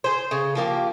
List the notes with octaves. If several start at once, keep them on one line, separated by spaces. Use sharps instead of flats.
G#4 C5
C#3
F3 A#3 G4